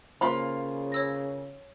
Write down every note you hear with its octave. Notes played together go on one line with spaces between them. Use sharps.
C#3 A#3 F4 C5 B5 C6
C#5 E6 A#6